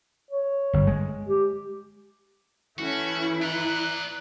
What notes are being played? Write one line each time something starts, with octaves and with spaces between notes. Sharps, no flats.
C#5
G1
G#3
G4
E3 A3 C#4 E4 F#4
D5 A#5 F#6